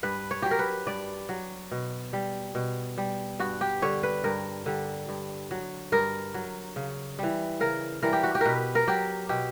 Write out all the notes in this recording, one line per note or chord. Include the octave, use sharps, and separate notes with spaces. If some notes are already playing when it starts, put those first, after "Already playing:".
G2 B4
C#5
F#3 G4
A#4
B4
G2 D5
F#3
B2
G3
B2
G3
G2 F#4
G4
D3 G3 C#5
B4
G2 A#4
D3 G3
G2
F#3
G2 A#4
F#3
C#3
E3 G3
C#3 A#4
E3 G3 A#4
G4
F#4
G4
B2 A#4 B4
A#4
F#3 G4
B2 G4